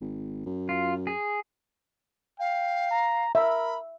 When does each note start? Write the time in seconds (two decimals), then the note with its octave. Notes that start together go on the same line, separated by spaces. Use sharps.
0.01 G#1
0.46 F#2
0.69 F4
1.07 G#4
2.39 F5 G5
2.91 A#5
3.35 A#4 E5 B5